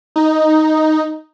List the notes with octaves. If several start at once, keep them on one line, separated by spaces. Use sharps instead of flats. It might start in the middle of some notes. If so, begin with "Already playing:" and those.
D#4